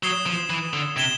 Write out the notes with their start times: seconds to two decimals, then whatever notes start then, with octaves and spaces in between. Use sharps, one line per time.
0.03 F#3 D#6 G#6 C7 E7 G7
0.26 F3
0.50 E3
0.73 D3
0.96 C3 D#6 G#6 C7 E7 G7